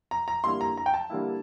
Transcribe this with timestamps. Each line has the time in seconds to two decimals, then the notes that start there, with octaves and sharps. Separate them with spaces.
0.11 A#5
0.28 A#5
0.44 D3 G3 A#3 E4 C6
0.61 A#5
0.77 A#5
0.86 G5
0.94 A5
1.10 D3 G3 A#3 E4